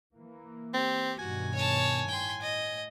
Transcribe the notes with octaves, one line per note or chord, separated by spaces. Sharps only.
E3 A#3
C4 G4
G2 B2 D#3 F#4 G#5
C#5 A5
A2 G5 C6
D#5